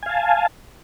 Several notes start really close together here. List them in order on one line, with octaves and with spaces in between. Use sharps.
G#5 F5 A5